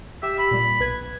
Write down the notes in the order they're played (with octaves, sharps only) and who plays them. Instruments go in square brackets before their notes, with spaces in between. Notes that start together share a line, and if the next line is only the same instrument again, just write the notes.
[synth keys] G4 [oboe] E5
[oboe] B5
[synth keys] A#2 G3
B1 B4 G#6